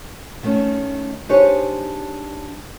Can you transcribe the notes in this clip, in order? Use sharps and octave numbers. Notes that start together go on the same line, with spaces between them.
D#3 A3 C#4
D4 D#4 G4 G#4 C5 C#5